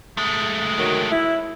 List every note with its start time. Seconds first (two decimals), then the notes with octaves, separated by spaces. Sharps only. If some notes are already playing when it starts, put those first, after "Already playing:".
0.17 G#3 A3
0.79 D#3 F#3
1.11 E4